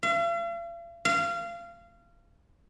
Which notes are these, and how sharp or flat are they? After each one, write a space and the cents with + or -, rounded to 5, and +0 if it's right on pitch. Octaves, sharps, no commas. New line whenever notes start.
F5 -45
F5 -25